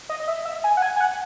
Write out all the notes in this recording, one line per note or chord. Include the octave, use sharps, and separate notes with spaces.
D#5
D#5
E5
E5
G#5
F#5
G#5
G#5
F#5